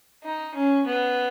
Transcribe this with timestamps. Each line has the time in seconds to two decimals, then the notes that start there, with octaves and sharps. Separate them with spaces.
0.24 D#4
0.55 C#4
0.86 B3